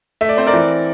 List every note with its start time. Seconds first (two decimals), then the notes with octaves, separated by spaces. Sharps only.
0.21 A3 E5
0.29 D5
0.37 C4 C5
0.46 A#4 D5
0.54 E3